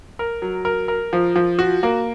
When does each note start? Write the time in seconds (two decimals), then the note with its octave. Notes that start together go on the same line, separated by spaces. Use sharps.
0.19 A#4
0.42 F#3
0.65 A#4
0.88 A#4
1.13 F3
1.36 F3
1.59 F#4
1.83 A#3